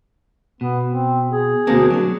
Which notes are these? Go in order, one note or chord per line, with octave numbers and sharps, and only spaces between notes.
B2 B3
C4
G#4
D2 B2 D3 A#3 C4
F#3 D4 C#5